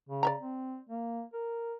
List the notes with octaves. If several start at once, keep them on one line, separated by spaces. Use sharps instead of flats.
C#3
D5 E5 A#5
C4
A#3
A#4